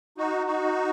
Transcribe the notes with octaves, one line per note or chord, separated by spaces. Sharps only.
D#4 F#4
D#4 F#4